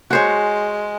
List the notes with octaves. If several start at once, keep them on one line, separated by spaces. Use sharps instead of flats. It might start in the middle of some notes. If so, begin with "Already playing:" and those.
G#3 F#4 C5 C#5